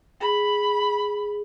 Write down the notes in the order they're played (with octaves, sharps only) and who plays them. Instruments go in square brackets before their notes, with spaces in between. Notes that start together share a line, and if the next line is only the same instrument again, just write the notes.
[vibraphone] G#4 [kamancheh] B5